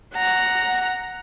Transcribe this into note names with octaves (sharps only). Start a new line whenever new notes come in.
F#5 A#5